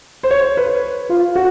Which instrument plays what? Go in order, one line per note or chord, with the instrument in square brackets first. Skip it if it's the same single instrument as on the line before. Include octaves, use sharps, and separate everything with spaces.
[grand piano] C5
C#5
B4
F4
F#4